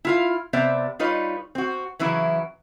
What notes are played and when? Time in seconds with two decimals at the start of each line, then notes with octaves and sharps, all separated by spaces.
0.05 E4 F4 F5
0.53 C3 B3 C5 D5 E5
0.99 G3 D#4 F4 B4 C#5
1.55 C4 F#4
1.99 C#3 E3 F#3 E4